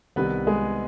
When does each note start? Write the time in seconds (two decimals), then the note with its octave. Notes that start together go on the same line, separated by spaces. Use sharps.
0.16 C2 C3 D#3 B3 B4
0.47 G#3 G#4